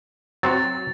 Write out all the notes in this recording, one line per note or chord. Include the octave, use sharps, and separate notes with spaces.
F#3 C4 F#4 A6